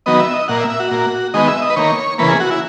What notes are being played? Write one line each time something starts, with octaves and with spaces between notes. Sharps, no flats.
D#3 F#3 B3 D#5
E5
D#5
A#2 A#3 F#5
E5
E5
F#4
A#2 A#3
D#3 G#3 B3 D#5
E5
D#5
B4
D#3 A#3 C#5
C#3 E3 A#3 B4
G#4
F#4
E4